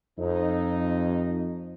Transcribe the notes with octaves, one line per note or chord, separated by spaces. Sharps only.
F2 D#4